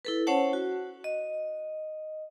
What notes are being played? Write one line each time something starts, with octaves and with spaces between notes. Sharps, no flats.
E4 A4 B4
C#4 C5 C#5 F#5 A5
F#4
D#5